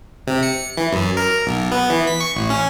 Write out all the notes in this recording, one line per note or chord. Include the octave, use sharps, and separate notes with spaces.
C3
C#7
E3
F#2
A#4
B1
B3
E3
B6
C#6
A1
C#4